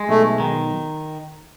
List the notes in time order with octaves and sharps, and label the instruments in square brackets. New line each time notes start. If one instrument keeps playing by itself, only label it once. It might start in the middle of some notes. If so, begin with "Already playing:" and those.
Already playing: [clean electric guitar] G#3
[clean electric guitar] B1 [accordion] A3
[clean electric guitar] D#3